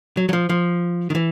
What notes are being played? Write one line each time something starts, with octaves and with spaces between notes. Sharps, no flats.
F#3
F#3
F3
F3
D#3
E3